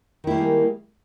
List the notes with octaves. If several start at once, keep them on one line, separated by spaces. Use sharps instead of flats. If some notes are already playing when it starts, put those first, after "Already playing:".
D#3 G3 G#3 A#3 E4